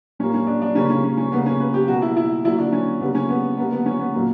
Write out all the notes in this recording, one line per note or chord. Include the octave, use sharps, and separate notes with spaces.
A#2 G3 A#3 C#4
C#4
D4
D4
C#3 G3 A#3 C#4
C#4
C#4
C#4
C#3 G3 A#3 B3
C#4
B4
G4
B2 A#3 F#4
E4
E4
D3 F#3 A#3 E4
D4
C#4
C#3 G3 A#3 B3
C#4
B3
D3 G3 A#3 B3
B3
C#4
B3
A#2 F#3 A#3 B3